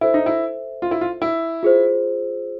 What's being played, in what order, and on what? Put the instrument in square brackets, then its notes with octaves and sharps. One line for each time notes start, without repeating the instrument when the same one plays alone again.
[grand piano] E4 [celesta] A4 C5 E5
[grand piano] D#4
E4
F4
E4
F4
E4
[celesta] F4 G#4 C5